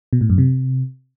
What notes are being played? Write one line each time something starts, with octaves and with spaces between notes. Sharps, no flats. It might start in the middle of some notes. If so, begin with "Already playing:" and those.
B2
A2
F#2
C3